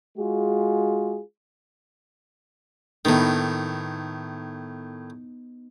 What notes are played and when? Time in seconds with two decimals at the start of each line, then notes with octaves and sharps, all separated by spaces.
0.18 G#3 F4 F#4 G#4
3.05 A2 D#3 B3 D#4